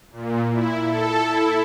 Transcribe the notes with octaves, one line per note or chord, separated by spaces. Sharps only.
A#2
E4
A4
E4